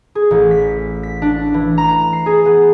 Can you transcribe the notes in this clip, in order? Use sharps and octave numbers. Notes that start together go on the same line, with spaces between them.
G#4
A1
B6
B6
D4
E3
A#5
C7
G#4
B3